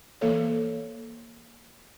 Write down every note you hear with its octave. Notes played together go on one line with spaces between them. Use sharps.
E3 A#3 A4 C#5